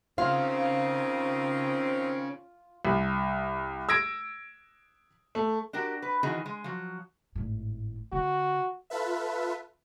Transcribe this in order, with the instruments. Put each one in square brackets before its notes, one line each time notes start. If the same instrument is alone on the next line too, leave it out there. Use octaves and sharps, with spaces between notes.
[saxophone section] D#3 C4 [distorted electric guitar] C#4 G#4 [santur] F4 [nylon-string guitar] F5
[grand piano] C2
E6 G#6 A#6 D7
A3
[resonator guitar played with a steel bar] D4 F#4 G4 A#4
B4
D#3 E3 D#4 F#4 G#4
G#3
F3 F#3
[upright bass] G#1 A2
[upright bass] D3 [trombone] F#4
[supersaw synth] F4 A4 B4 E5